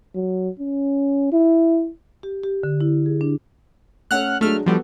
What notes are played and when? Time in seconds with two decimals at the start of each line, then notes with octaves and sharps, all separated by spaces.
0.15 F#3
0.60 C#4
1.33 E4
2.23 G4
2.43 G4
2.63 D3
2.81 E4
3.06 G#4
3.21 D4
4.11 A3 C#4 A4 F#5 F6 F#6
4.41 F#3 G#3 A3 D4 F6
4.66 F3 G3 B3 F#4 A4